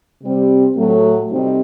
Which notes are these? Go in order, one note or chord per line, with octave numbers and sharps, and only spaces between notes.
C3 G3 C4
A2 F#3 A3
C3 G3 C4 D#4